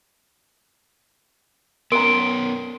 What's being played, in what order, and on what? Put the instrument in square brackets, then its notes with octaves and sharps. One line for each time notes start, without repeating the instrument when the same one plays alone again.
[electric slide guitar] B3 C#4 [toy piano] A#4 A#5 [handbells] C6 [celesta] D7